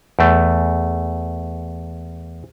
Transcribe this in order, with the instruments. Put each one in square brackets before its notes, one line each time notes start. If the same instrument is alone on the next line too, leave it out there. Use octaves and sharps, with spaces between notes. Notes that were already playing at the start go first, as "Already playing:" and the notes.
[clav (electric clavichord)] E2 A3